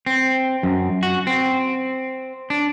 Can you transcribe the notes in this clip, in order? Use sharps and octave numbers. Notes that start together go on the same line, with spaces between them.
C4
F#2
F#4
C4
D4